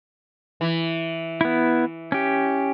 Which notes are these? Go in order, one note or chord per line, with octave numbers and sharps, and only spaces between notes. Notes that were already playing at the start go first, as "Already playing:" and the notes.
E3
B3 E4
C#4 G4